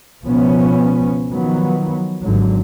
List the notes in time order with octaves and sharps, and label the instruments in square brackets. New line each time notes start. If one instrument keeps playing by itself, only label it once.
[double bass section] C#2 B2 F3 B3 C#4
D#3 F3 F#3 B3
G#1 G#2 D3 F#3